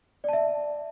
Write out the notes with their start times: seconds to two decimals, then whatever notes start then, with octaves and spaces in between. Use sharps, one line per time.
0.24 D5
0.29 A5
0.33 E5